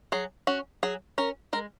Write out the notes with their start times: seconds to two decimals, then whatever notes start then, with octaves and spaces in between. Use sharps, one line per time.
0.12 F#3 G#4
0.47 C#4 F#4
0.83 F#3 G#4
1.18 C#4 A#4
1.53 G#3 A#4